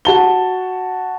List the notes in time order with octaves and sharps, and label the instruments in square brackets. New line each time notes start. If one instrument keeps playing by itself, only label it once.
[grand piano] F#4 A5 G7